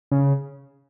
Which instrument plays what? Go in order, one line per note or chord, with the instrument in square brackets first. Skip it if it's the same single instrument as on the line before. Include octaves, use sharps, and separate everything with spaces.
[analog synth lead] C#3